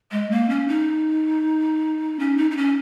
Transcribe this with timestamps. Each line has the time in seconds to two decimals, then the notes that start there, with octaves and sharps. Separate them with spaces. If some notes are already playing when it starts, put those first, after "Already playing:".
0.11 G#3
0.30 A#3
0.49 C#4
0.68 D#4
2.19 C#4
2.37 D#4
2.51 D#4
2.57 C#4